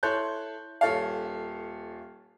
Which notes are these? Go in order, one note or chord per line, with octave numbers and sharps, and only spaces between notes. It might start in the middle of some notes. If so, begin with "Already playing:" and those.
E4 A4 C#5 C6 F#6 G6
D#1 A4 C#5 F5